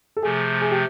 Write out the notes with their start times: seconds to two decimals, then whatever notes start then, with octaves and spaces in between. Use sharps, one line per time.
0.17 A4
0.23 C3 F3 A3 G#4
0.61 G#4
0.71 G4